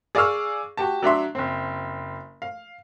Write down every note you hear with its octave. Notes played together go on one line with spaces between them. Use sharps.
G#4 D5 F5 C#6 E6 F6
F#4 G4 A5
F#3 D4 E5 C6
F#1 C4
F5